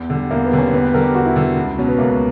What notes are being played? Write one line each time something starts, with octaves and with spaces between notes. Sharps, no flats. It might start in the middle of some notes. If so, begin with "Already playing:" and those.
Already playing: E2
D3 G3
E2 A#3
B3
D3 G3
C#4
E2 B4
B4
D3 G3 A#4
G4
E2 F#4
E4
D3 G3
C#2
B2 F#3 C#4
B3
C#2 A#3